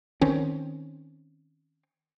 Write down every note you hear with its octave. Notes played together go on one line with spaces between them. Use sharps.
D#3 C4 C#4